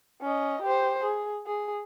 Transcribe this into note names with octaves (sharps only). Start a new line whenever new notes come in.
C#4 D#5
G4 C5
G#4
G#4